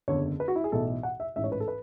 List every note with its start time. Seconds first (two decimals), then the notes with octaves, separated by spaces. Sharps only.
0.08 F#1 E2 D3 C#5
0.40 B4
0.48 F#4
0.56 E4
0.64 G#4
0.72 B1 A2 E3 A4
1.03 F#5
1.20 E5
1.36 A1 G#2 E3 E5
1.44 C#5
1.52 B4
1.60 A4
1.68 B4